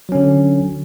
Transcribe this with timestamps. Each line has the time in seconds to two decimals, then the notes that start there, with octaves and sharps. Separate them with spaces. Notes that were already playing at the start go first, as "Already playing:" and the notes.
0.09 F#3
0.12 C#4
0.15 D3